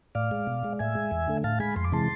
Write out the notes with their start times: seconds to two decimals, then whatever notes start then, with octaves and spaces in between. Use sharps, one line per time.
0.15 A2 D5 F5
0.31 G#3
0.47 B2
0.64 G#3
0.79 A2 E5 G#5
0.95 G#3
1.11 E2
1.28 D3 A3
1.44 A2 F5 A5
1.59 G#3 G#5 B5
1.76 F2 C6
1.84 D6
1.92 C3 E3 G#3 A5 C6